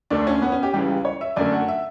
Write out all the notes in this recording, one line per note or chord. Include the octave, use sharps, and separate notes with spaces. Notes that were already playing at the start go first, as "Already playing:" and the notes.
D2 D3 A3 D4
C#4
B3
C#4
G4
C#2 C#3 E3 G3 G4
C#5
E5
F#2 D3 A3 D5
F#5
E5